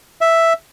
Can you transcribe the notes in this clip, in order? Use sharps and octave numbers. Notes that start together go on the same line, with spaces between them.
E5